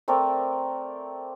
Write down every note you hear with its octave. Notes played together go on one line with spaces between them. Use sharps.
A3 C4 A#4 D5